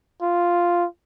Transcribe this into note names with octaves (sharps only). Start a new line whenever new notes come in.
F4